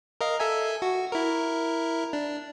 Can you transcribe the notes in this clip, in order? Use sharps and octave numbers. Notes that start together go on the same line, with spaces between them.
A#4 D#5 F5
A4 E5 G#5
F#4
E4 A#4
D4